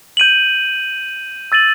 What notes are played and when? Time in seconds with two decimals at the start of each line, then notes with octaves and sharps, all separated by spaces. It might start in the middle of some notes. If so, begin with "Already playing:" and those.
0.17 G6 D#7 F#7
1.52 E6 A6 D#7 F#7